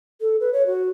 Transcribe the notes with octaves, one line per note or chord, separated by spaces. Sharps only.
A4
B4
C#5
F#4